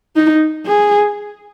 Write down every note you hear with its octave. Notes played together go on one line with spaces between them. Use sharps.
D#4
G#4